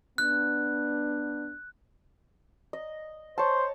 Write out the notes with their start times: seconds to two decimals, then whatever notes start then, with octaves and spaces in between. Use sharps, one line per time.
0.18 B3 D4 F#6
2.73 D#5
3.38 C5 C#5 A5